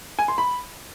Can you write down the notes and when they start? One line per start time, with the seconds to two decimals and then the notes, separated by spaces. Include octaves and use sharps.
0.19 G#5
0.28 C6
0.38 B5